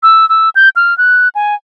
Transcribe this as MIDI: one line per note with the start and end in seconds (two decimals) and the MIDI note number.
0.03 0.28 88
0.29 0.49 88
0.55 0.69 91
0.76 0.96 89
0.98 1.28 90
1.35 1.55 80